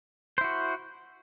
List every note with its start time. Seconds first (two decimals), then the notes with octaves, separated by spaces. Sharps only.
0.38 C5
0.41 E4
0.44 F#4